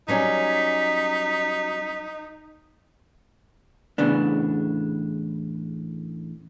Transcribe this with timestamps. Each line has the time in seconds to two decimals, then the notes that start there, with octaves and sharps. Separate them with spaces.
0.08 F#3 G3 C#4 D#4 B6
3.98 E2 A2 C#3 B3 D4